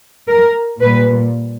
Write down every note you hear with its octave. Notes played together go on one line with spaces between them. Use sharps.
A#4
A#2 G3 B4